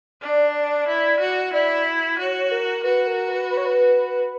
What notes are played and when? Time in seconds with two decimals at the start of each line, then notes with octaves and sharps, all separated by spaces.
0.22 D4 D5
0.88 E4
1.20 F#4
1.53 E4 D5
2.18 F#4 C#5
2.51 A#4
2.84 F#4 B4
3.07 A#4
3.28 B4
3.50 B4
3.57 C#5
3.65 B4